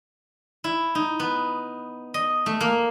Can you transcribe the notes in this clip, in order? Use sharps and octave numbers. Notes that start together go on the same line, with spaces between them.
E4
D#4
B3
D#5
A3
A#3